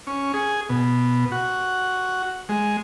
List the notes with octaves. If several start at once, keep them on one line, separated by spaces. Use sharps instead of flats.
C#4
G#4
B2
F#4
G#3